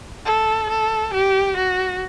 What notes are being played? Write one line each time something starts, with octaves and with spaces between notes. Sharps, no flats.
A4
A4
G4
F#4